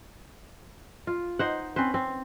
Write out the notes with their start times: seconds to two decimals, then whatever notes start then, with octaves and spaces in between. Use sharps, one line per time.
1.07 F4
1.39 D#4 C5 F#5
1.76 C4 C#4 B4 C5
1.94 C4